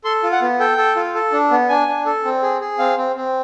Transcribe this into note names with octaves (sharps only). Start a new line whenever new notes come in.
A4 C6
F4
F#5
B3
A4 G5
A4
F4
A4
D4
B3
D4 G#5
D4
A4
C4
G#4
G#4
C4 F5
C4
C4